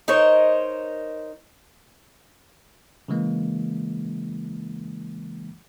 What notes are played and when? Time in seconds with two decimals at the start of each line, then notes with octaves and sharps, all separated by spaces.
0.08 D#4 A#4 C5 C#5
3.08 C#3 E3 G#3 A#3